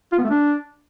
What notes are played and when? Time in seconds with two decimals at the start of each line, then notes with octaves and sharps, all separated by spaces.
0.12 F4
0.18 B3
0.24 A3
0.30 D4